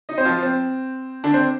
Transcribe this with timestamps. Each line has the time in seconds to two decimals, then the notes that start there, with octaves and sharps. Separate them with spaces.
0.09 D#4 D#5
0.18 C4 C5
0.25 F3 F4
0.43 C4
1.24 D3 D4
1.34 C4 C5